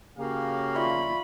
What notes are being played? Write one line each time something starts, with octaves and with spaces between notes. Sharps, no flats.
C#3 A#3 F#4 G4 F5
F4 D5 E5 B5 C#6